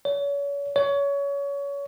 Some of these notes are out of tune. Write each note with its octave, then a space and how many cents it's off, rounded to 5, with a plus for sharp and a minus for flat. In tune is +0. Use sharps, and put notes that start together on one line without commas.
C#5 +35
C#5 +25